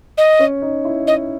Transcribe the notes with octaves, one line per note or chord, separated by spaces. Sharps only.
D#5
C#4
D#4
E4
D#5